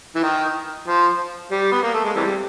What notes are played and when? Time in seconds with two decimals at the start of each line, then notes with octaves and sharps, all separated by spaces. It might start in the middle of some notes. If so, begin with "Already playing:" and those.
0.16 E3
0.24 D#3
0.88 F3
1.52 G3
1.72 B3
1.83 A#3
1.94 A3
2.04 G#3
2.16 C3 E3 G3